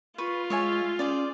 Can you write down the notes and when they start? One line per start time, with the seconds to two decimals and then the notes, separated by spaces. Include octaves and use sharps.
0.18 F4 B4 B5 C#6
0.50 G#3 C#5 E5 G#5
0.99 C#4 G#4 C5 D5